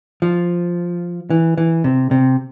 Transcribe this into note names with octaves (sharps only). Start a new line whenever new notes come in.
F3
E3
E3
C3
C3